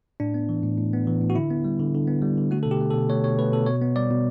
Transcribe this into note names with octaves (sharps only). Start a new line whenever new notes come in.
A2 D4
B3
E3
A2
A2
B3
E3
A2
F#4
D3 E4
B3
G3
D3
D3
B3
G3
D3
A3 F#4
A4
B2
G4
A3
A4
B2
A3 C#5
B2 C#5
A3 B4
B2 A4
B2 C#5
B3
G3 D5
B2